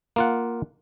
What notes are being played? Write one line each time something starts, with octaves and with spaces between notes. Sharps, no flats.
A#3 F4 F#5